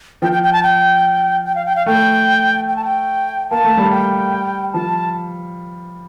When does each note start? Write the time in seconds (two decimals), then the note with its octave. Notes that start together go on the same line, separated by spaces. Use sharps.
0.22 F3 G5
0.32 G5
0.43 G5
0.53 A5
0.63 G5
1.46 G5
1.55 F5
1.66 G5
1.76 F5
1.86 A3 G5
2.69 G5
2.76 A5
2.84 G5
3.51 A#3 A5
3.64 A3
3.77 G3
3.91 G5
4.73 F3 A5